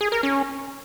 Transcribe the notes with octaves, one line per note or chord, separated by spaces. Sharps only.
G#4
A#4
C#4